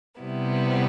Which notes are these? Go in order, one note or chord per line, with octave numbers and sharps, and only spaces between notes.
C3 G3 B3 E4